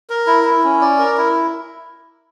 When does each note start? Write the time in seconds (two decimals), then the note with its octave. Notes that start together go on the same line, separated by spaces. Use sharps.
0.10 A#4
0.27 E4
0.45 E4
0.64 C#4
0.81 D5
0.99 A#4
1.17 E4